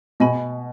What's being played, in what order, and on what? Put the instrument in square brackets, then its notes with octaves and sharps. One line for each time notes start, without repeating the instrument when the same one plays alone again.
[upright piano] B2 [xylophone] D#5 G#5 B5